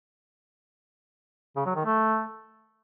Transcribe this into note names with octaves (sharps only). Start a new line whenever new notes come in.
C#3
F#3
D#3
A3